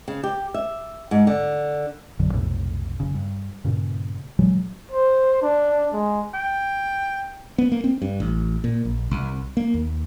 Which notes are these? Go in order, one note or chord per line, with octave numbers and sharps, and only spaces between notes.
C#3
G4
E5
G#2
D3
A1 F2 D3 F#3
B1 F2 A2 C3
F#1 C#3
G2
G2 A#2 C#3
A#2 E3 F#3 G#3
C5
D4
G#3
G5
B3
A#3
C4
G2
A1
A#2
A#1
C2
A#3
D#2